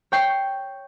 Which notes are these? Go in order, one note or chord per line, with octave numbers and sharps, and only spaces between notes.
C#5 G5 C7